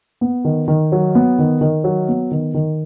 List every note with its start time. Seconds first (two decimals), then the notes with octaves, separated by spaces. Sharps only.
0.21 B3
0.45 D#3
0.68 D#3
0.92 F#3
1.15 B3
1.39 D#3
1.61 D#3
1.84 F#3
2.08 B3
2.31 D#3
2.54 D#3